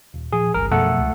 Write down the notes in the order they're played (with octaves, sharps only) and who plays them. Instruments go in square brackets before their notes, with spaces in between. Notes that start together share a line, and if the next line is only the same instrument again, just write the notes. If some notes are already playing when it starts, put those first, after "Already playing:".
[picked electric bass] D#1
[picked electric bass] A#2 F3 [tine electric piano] G#4
[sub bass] G#1 [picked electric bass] C#2 G2 G3 [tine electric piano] A#4
[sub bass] F#2 [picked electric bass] B2 F3 F#3 [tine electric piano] A3 A4 F#5
[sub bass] C#2